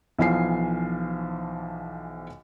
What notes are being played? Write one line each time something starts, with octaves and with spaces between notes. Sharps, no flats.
B1 E3 F3 F5 G#5 C7